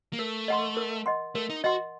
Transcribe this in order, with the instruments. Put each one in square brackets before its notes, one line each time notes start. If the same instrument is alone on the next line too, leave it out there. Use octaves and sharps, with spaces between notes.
[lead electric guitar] A#3
[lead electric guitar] A3 [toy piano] A#4
[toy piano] D#5 F#5 C6
A#4
D#5 F#5 C6
[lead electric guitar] A3 [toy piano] A#4
[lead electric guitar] D#4
[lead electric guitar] F#4 [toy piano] D#5 F#5 C6